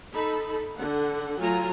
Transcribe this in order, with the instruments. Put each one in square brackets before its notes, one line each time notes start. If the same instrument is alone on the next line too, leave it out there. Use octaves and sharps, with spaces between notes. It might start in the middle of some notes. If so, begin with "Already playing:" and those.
[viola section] D#4 A4 B5
D3 F#5
F#3 A3 F4 G#5 A#5